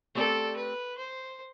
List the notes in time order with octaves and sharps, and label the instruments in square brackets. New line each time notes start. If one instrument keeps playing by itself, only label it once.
[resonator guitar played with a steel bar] A3 C4 G4 D5 [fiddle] A4
[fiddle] B4
C5